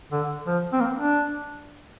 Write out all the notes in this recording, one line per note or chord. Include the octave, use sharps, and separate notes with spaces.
D3
F3
C4
A#3
D4